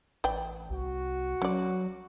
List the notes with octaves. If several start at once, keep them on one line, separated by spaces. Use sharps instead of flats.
A1 B4 D5 G5
C2 F#4
F#3 C#4 D5